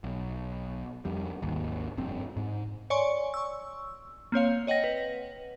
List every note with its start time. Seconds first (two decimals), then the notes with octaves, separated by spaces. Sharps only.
0.04 B1
1.05 F2 G3
1.42 G#1 D#2
1.98 F1 G2 C4
2.37 G#2
2.90 C#5 D5 G#5 C6 C#6
3.34 C#6 E6
4.32 A#3 C4 C#5 F5
4.67 C#5 D#5 F#5 G5 A#6
4.84 B4